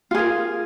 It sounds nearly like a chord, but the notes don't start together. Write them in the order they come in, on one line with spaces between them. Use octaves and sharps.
F4 G#4 A#4